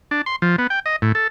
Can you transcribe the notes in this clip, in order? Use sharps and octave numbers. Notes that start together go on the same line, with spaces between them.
D4
C6
F3
B3
G5
D#5
A2
A4